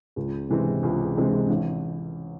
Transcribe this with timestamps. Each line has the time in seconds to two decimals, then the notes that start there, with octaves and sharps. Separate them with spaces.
0.16 C#2
0.49 C3 E3 G#3 C4
0.83 C#2
1.16 C3 E3 G#3 C4
1.49 A1